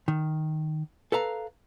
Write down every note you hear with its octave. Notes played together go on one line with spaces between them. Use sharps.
D#3
A4 B4 F5 A#5